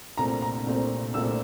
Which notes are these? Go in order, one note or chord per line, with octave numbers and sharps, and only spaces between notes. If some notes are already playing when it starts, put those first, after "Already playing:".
C2 A#2 A3 C4 A#5
A#5
C2 A#2 A3 C4
C2 A#2 A3 C4 E6